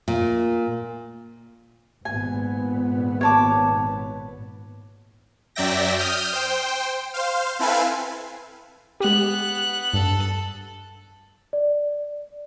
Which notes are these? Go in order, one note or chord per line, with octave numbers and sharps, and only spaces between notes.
A#2
G#1 A#2 B3 G#5
C#5 A5 D6
F#2 F#3 D5 E5 G5 A#6
D#6 F6 G6
C5 G5
C5 F5
C4 E4 A4 B4 F5 G#5
G#3 B3 G4 F#6
G2 A4
D5